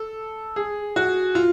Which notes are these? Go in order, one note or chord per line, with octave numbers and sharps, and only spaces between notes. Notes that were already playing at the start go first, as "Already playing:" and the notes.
Already playing: A4
G#4
F#4
F4